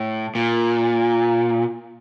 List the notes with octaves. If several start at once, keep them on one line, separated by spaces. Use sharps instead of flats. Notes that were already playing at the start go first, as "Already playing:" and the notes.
Already playing: A2
A#2